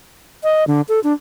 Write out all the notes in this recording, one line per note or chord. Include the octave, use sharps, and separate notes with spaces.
D#5
D3
A4
D4